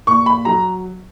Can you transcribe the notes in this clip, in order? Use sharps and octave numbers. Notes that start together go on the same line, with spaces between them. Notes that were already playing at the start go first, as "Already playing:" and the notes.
A#2 C#6
B5
F#3 A#5